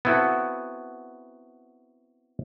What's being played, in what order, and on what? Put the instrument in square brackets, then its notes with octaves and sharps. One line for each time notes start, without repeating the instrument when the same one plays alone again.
[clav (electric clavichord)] B3 C4 E4 F#4 A4